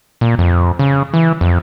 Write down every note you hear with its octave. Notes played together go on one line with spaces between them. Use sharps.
A#2
F2
C#3
E3
F2